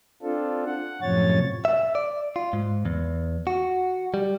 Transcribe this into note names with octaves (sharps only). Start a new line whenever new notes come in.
C4 D4 F4 A4
F#5
F#2 A2 C3 F3 C#5 A6
E5
D5
F4
G#2
E2
F#4
G3